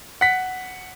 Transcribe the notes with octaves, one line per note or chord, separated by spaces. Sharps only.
F#5 B6